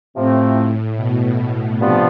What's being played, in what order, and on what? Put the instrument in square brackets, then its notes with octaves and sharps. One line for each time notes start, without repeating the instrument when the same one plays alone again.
[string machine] A2 [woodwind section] C3 F3 A3 C4
[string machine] B2
B2
[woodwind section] G2 F3 B3 F4 [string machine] C3